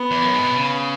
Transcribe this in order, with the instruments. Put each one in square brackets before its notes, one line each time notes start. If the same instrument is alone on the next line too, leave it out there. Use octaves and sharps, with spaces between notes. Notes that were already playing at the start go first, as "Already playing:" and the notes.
Already playing: [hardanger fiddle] B3
[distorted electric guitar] E2
F#2
G#2
B2
C#3